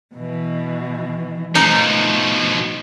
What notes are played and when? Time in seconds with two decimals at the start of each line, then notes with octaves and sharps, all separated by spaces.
0.15 B2 E3
1.55 B2 F3 A3 D#4